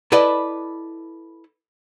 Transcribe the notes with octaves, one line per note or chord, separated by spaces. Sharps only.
E4 A4 B4 D5 D#5